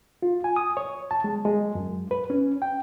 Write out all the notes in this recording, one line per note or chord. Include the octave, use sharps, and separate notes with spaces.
F4
G#5
D#6
C#5
A5
G#3
G#3
F#2
B4
C#4
G5